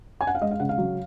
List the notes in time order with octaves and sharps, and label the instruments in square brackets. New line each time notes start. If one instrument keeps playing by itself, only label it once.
[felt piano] G#5
F#5
F5
G#3 D#5
F5
C#3 F#5
F5
F#3